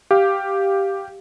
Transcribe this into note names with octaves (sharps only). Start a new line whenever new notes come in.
G4 F5